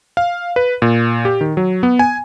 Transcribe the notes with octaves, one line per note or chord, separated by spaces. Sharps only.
F5
B4
A#2
G4
D#3
F#3
B3
G#5